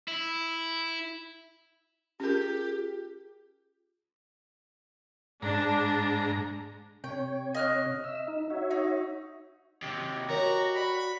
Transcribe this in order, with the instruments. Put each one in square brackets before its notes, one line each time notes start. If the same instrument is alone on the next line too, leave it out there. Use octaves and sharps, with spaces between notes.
[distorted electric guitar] E4
[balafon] C#4 A#4 [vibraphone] F4 G#4 [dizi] G4
[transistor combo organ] G#2 A#5 [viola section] D4
[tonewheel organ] C3 C#5 [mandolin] G5
[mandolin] D#5 F6 F#6
[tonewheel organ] E5 E6
D#4
F#4 C#5 E5
[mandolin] D#4
[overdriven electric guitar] D#2 C3 [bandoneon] G4 D#5
[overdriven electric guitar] F#4 [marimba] A#4 C#5 [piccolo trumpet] A#5
[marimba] D5 [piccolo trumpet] B5